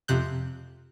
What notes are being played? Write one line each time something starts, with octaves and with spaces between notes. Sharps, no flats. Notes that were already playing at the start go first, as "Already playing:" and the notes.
F2 C3 F#6 G6